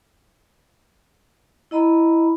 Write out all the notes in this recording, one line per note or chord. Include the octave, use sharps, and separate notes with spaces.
E4 D#5 A#5 B5